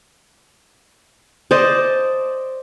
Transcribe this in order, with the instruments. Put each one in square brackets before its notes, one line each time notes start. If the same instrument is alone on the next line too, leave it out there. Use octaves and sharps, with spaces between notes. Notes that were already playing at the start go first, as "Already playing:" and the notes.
[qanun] C5 D5 D#5 A5